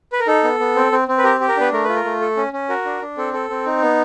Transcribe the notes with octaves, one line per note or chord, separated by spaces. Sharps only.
B4
A#4
D#4 A4
B3
B3
C4
C4
C4
B4
G4 A#4
G4
A#4
B3 D4 B4
A3 A#4
F4 B4
A#4
A3
A4
C#4
C#4
F#4 A#4
D4
D4
C4 A4
A4
C4
D#4
B3